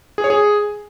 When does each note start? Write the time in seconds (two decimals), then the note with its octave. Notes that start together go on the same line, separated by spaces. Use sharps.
0.18 G#4
0.24 C#5
0.30 G#4